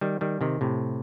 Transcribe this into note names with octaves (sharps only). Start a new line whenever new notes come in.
D#3 G3
D#3 G3
C3 D#3
A2 C3